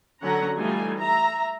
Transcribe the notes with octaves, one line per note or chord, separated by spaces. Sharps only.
D3 F#3 C#4 F#5 A#5
E3 G3 A3 D#4 F4 G#5
E5 A#5